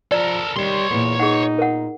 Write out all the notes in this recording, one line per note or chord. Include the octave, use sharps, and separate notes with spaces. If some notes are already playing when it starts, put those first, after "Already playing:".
F3 A4 A#4 D5
D#3 G3 C#5 C6
E2 A#2 B3
D#4 G#4 F#5
A#4 F#5